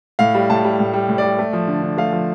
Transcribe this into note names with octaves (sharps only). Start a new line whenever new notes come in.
A2 F5
G3
A2 A5
G3
A2
G3
A2
G3 D5
A3
F3
D3
D3
A3 F5
F3